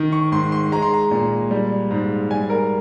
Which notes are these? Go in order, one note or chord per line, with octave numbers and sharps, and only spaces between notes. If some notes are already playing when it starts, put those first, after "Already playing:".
Already playing: D#3
C#6
G#2 C6
C6
G#3 A#5
C6
A#5
A#2
G3
G#2
G3 G#5
A#4